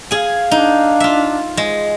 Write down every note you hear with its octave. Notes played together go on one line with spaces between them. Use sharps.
G#4 F5 G#5
D4 D#4
F4 E5
G#3